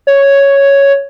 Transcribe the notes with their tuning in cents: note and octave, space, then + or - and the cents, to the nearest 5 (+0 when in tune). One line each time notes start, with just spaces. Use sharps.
C#5 +0